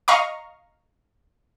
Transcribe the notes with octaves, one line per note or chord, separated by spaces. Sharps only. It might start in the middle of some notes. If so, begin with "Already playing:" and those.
D#5 F5 A#5 C#6